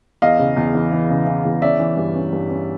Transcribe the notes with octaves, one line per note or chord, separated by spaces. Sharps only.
E2 D#5 F5
C#3
E2
E3
E3
C#3
E3
E2
C#4 D5 E5
E3
G2
C#4
G2
C#4